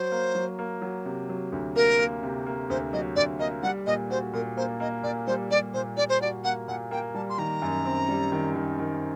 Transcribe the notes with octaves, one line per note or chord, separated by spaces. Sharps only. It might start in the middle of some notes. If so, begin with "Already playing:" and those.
Already playing: F#3 C5
A#3
F#3
A#3
F#3
C3
F#3
D2
A#3 A#4
A#3
C3
A#3
D2 C5
F#3 D#5
D2 D5
A#3 D#5
G3 F#5
A#2 D#5
F#4 C5
A#2 A#4
A#3 C5
A#3 D#5
A#2 D5
G3 C5
G3 D5
A#2 C5
G3 D5
C5
F#4 D5
A#3 F#5
A#2 F#5
A#3 G5
G3 A5
C6
D#3 A#5
F#2
C4
G3
D#3
D#3
D#3